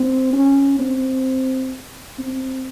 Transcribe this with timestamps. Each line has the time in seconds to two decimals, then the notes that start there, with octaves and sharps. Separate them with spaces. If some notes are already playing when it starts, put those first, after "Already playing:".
Already playing: C4
0.33 C#4
0.79 C4
2.19 C4